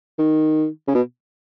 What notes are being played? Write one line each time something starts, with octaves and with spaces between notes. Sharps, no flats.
D#3
C#3
B2